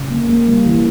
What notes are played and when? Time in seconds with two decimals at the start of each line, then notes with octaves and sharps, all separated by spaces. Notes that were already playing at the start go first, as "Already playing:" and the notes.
Already playing: C#3
0.11 A#3
0.29 A#3
0.48 G3
0.66 E3